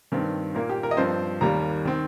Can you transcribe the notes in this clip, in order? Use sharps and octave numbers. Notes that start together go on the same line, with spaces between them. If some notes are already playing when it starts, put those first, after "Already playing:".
G2 D#3 C4
A#2 A#3 A#4
G4
A#4
D#5
G2 F3 C4 C5
D#2 D#3 G3 A#3 A#5
D#3 C4